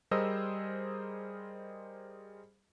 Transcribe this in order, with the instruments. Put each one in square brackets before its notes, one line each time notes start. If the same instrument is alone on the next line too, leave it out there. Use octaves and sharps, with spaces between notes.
[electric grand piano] G3 G#4 A#4 C5 D#5 E6